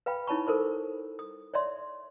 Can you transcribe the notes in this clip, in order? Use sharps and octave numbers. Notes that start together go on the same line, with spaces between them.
B4 F5 G5 B5
D#4 E4 C#5 A5 B5 C#6
A4 A#4 C5 D6
D#6
C#5 D5 E5 C6